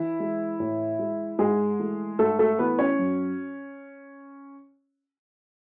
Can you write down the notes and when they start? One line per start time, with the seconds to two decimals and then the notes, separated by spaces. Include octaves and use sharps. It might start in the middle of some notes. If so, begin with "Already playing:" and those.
Already playing: E3 E4
0.20 G#3
0.60 A2
0.99 G#3
1.39 G#2 G#3 G#4
1.79 E3 A3
2.19 G#2 A3 A4
2.39 A3 A4
2.59 E3 A3 B3 B4
2.79 C#4 C#5
2.99 F#2